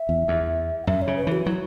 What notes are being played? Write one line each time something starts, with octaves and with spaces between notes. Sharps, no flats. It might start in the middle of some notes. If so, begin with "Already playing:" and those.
Already playing: E5
E2
E2
F#5
F#2 E5
C#5
C#3
B4
E3 F#4
F#3 E4